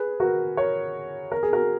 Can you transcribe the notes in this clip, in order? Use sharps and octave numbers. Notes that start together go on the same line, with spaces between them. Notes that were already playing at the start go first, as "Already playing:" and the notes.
Already playing: G#4 B4
F#4 A#4
A#4 C#5
A#4
G#4
F#4 A#4